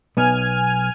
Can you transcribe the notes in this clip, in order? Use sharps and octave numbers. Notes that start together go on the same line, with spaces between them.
B1 B3 G#5 F6